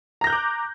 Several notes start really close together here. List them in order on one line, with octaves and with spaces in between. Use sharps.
A#5 A#6 G6 F#6 D6